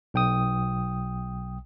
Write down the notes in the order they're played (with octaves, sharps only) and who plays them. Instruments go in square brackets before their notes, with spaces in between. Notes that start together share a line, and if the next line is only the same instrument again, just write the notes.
[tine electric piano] B1 G5 D#6